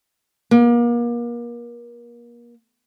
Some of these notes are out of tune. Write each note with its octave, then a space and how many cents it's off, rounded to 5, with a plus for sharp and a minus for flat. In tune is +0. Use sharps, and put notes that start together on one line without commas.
A#3 +35